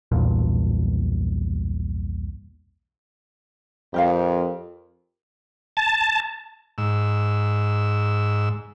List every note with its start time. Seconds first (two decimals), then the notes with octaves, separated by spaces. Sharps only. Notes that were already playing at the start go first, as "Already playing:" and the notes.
0.12 B1 E2 G2 A#2
3.94 F2 G4 A#4 F5
5.77 A5
6.78 G#2 E6